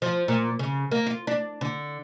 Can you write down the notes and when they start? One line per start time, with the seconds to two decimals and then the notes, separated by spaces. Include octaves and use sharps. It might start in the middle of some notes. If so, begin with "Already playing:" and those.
0.02 F3
0.28 A#2
0.59 C#3
0.91 A#3
1.07 F4
1.27 D4
1.61 D3